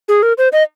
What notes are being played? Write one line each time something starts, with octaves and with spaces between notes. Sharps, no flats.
G#4
A#4
C5
D#5